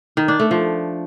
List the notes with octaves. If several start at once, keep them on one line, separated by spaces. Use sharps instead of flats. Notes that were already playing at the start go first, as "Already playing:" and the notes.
D#3
D4
A3
F3